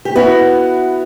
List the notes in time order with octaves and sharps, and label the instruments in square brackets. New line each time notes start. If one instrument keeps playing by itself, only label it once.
[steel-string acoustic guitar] G4
[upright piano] B3 [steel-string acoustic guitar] E4 F#4